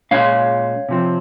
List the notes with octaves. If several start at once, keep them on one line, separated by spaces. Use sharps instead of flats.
A#2 G#3 C#4 C#5 F5
C3 F3 C4